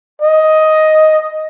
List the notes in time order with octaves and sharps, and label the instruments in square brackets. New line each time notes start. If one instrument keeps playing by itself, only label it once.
[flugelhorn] D#5